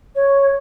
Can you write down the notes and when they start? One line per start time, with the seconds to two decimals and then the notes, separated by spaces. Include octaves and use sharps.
0.16 C#5